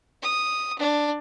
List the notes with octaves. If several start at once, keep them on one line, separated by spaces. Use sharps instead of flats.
D#6
D4